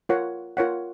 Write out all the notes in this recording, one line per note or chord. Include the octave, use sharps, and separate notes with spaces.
F4 A#4 C#5 F#5
F4 A#4 C#5 F#5